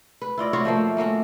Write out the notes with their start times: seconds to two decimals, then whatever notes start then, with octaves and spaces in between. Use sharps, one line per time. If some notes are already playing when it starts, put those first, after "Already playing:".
0.22 B4
0.38 E4 F4 D5 D#5
0.53 F4 F#4 C#5
0.65 F3 A3 A#3
0.97 A3 A#3 C#4 F#4